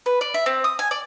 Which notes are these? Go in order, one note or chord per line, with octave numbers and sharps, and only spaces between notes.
B4
D5
E5
C4
D#6
G#5
D5